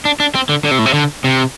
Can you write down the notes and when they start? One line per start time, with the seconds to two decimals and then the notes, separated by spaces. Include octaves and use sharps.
0.05 D4
0.20 D4
0.35 C4
0.49 D3
0.64 D3
0.71 C3
0.79 A2
0.86 C3
0.94 D3
1.24 C3